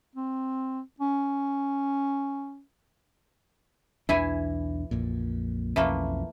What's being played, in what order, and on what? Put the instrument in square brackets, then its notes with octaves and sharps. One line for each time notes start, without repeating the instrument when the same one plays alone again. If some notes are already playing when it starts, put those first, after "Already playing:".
[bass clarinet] C4
C#4
[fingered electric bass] B1 E2 D4 [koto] E3 E4 G#5
[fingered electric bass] A#1 F2 A#2
[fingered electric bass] B1 F2 C#4 [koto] E3 A3 A#3